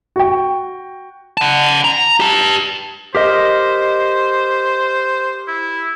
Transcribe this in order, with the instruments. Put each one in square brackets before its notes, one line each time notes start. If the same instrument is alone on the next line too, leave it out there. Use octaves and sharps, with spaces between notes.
[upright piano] F#4 G5
[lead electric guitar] F#5 A5
A#5
G4 A5
[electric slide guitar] G4 A#4 D#5 [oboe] C5
[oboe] E4